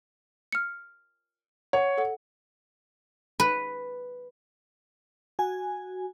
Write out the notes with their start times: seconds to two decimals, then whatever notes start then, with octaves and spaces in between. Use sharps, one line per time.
0.52 F6 C#7
1.73 C#5 F#5
1.98 A4 F#5
3.40 B4
5.39 F#4 G#5